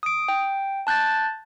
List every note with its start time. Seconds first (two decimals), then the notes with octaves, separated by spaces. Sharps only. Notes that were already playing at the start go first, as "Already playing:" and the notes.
0.03 D#6 D7
0.28 G5
0.87 A5 F#6 G6 A6